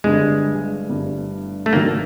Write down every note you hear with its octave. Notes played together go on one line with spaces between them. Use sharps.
G1 G2 D3 G#3
G1 G2 D3
A3
G#2 D#3 F#3 A#3